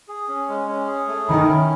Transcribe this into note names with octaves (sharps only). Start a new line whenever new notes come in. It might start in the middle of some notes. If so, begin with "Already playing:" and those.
G#4
C#4
G#3
C#4
G#4
A3
D#3 E4
C#4